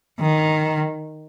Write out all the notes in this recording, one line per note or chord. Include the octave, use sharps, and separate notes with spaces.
D#3